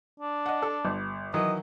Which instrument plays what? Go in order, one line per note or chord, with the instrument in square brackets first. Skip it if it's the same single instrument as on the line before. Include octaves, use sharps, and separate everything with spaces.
[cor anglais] D4
[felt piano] D#5 F#5
A4
G1
[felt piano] D#3 E3 F#3 [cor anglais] D#5